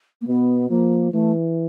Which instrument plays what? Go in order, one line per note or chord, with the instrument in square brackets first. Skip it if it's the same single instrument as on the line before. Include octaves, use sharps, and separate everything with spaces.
[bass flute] A#3
[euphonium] B2 [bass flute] B3
[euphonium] F3 [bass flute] A#3
[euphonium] E3 [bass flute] A3